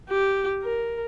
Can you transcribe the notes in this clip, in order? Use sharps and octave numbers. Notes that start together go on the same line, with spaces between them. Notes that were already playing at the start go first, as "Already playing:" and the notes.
G4
A#4